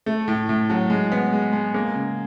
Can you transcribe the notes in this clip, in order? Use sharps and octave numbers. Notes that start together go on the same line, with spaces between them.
A3
A2
A2
F#3
G#3
B3
G#3
G#3
A#3
C#3